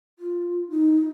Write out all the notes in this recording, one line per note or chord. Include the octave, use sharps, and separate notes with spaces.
F4
D#4